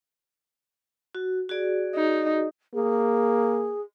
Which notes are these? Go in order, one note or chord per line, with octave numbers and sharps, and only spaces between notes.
F#4
F#4 G#4 D5
D#4
A#3 G#4